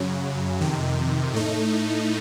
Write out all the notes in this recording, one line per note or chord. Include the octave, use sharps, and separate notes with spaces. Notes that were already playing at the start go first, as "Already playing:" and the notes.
Already playing: F#2 C#3 F#3
F2 C3 D#3
A2 A3 D#4